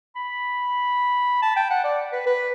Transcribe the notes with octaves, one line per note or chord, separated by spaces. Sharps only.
B5
A5
G5
F#5
D5
B4
B4